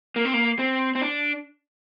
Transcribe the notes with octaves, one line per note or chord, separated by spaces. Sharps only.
A#3
C4
A#3
C4
C4
D4